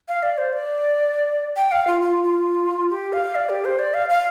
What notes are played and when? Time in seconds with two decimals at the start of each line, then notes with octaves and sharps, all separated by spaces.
0.08 F5
0.23 D5
0.38 C5
0.53 D5
1.56 G5
1.71 F5
1.87 F4
2.01 F4
2.24 F4
2.90 G4
3.13 F5
3.35 D5
3.49 G4
3.65 C5
3.79 D5
3.94 F5
4.09 F5